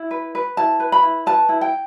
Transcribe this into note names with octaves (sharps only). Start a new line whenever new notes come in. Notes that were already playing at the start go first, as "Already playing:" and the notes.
Already playing: E4
B4
B4
E4 A5
B4
B5
E4
B4 A5
E4
G5